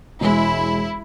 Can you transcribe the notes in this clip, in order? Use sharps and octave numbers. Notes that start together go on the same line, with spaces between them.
E1 G#3 E4